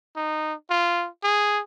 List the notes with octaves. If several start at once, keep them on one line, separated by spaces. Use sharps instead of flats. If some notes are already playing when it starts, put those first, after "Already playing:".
D#4
F4
G#4